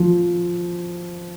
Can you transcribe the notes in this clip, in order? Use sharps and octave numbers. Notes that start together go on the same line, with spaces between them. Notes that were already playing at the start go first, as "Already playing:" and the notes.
Already playing: F3